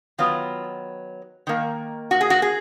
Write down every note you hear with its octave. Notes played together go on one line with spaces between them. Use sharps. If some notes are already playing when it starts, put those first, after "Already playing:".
D#3 F#3 B3 F4
D#3 A#3
F#4
G#4
F#4
G#4